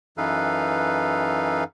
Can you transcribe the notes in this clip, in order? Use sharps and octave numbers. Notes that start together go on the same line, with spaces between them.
F#2 E3 D#4 A4 B4 F5